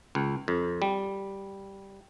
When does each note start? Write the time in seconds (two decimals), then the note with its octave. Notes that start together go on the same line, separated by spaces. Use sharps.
0.15 C#2
0.48 F2
0.82 G3